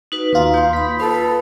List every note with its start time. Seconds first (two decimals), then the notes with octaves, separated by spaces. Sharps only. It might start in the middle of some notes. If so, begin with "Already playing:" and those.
0.12 D#4 F#4 B4
0.33 D#2 D#4 F4 B4 A#5
0.54 A#3 C6 G6
0.73 B5 D#6 B6
1.00 F4 A4 B4